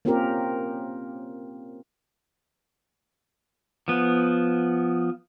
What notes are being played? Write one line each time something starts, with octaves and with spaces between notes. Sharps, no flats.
A#3 C4 C#4 F4 G4 A#4
F3 B3